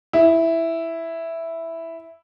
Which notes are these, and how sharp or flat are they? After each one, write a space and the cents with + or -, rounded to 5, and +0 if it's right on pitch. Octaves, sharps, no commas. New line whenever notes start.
E4 +0